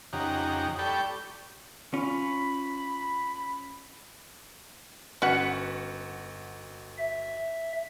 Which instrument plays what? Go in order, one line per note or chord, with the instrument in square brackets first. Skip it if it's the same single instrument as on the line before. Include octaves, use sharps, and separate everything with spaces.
[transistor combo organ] F2 C#3 D#4 G4 F#5 A#5
G4 A4 D5 G5 B5 C#6
[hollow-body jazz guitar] C#4 F4 [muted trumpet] B5
[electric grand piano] G1 F#4 C#7 [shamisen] C#4 B4 F#5
[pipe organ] E5